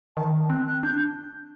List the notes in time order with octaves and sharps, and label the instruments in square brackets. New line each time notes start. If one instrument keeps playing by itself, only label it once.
[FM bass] D#3 [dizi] A5
[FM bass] C4 [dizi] F#6
[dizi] F#6
[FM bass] D4 [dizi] G6